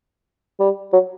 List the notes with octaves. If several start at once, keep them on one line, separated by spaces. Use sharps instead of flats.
G3
F#3